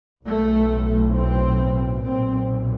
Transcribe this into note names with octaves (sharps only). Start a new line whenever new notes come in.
B1 A2 A3
C4
B1 A#2 C4